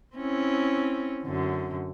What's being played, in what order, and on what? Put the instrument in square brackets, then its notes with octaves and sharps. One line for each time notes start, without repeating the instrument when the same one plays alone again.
[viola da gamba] C4 C#4 E4
F#2 D3